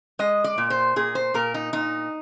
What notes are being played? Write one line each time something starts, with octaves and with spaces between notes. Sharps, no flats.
G#3 D#5
D5
A#2
C5
A#2 G#4
C5
A#2 A#4
D#4
A#2 D#4